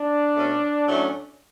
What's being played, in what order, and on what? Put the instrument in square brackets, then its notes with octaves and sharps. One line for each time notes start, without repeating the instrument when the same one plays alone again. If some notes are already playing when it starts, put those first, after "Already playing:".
Already playing: [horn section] D4
B2 A3 C#4
A2 F#3 A3 C#4